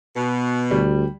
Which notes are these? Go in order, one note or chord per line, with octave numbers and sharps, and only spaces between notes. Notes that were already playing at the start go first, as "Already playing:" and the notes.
B2
D2 G3